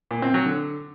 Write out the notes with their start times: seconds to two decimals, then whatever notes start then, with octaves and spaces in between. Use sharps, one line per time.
0.11 A#2
0.22 C4
0.34 F#3
0.46 D3